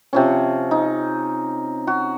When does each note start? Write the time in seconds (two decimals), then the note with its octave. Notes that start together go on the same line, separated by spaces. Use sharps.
0.13 C3 F3 C#4
0.71 D#4
1.87 F#4